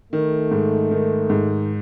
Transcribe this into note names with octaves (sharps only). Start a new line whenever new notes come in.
D#3 A3
G#2
D#3
G#2